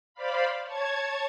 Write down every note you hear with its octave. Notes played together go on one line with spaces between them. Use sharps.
C5 D5 F5 B5
C#5 A5 G#6